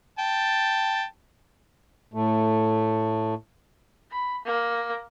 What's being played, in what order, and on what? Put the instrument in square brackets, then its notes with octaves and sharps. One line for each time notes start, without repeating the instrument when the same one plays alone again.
[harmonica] G5 A5
[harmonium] A2 A3
[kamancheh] B5
A#3